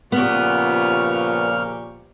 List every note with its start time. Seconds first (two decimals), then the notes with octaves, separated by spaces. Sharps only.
0.12 A#2 C#3 F3 B3 G4 C#6 F6